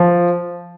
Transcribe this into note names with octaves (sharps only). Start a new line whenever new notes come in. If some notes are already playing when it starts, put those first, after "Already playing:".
Already playing: F3